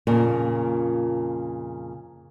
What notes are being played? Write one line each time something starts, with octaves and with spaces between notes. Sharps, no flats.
F2 A#2 C#3 A#3